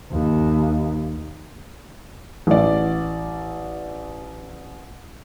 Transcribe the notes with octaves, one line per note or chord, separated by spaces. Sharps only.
D#2
A1 D5